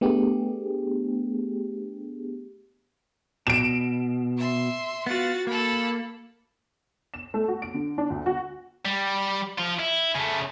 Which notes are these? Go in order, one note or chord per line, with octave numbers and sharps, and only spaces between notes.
A3 B3 D4 G4 G#4
B2 D7 E7
E5 C6
B3 F4 F#4 F#5 A6
A#3 A4 B5
E7
A3
F#4
D7
D3
D4
D2
F#4
G3
F3 F4
E4
C#3 A3